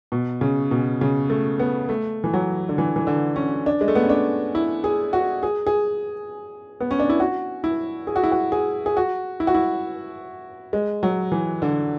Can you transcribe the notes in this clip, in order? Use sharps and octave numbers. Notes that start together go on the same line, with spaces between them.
B2
C#3
B2
C#3
A3
B3
A3
E3
F#3
D3
E3
E3
D3
C#4
D4
G#3
A3
B3
C#4
D4
E4
G#4
F#4
G#4
G#4
B3
C#4
D4
E4
F#4
E4
G#4
F#4
E4
F#4
G#4
G#4
F#4
E4
F#4
E4
G#3
F#3
E3
D3